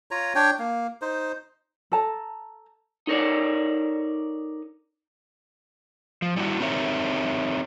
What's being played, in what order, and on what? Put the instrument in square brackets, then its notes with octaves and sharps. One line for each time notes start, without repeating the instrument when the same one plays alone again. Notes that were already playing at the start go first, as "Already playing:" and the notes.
[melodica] F4 C#5 A#5
D4 C#5 G5
A#3
D#4 C5
[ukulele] A4 A5 A#5
[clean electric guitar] D#4 A4 A#4 C#5 D5
[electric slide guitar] F3
G3 E4 F#4
C4 D#4 G4 A#4 C#5 E5